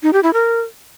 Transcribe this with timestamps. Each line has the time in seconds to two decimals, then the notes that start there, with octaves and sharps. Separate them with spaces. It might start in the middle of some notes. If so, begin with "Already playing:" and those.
0.03 D#4
0.13 G4
0.23 E4
0.33 A#4